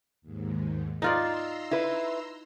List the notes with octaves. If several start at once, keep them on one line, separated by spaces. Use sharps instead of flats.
D#2 G#2
D#4 F4 D5 A#5 C6 E6
E4 B4